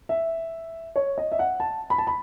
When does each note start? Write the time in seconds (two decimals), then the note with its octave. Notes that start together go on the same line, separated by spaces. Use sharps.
0.09 E5
0.96 C#5
1.18 D#5
1.32 E5
1.39 F#5
1.60 A5
1.90 B5
1.98 A5
2.07 B5